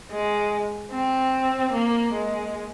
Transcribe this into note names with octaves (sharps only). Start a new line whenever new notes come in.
G#3
C4
A#3
G#3